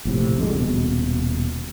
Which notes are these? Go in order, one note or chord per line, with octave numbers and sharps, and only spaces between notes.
A#1 A2 C3
F2 D3 G#3
D#1 B2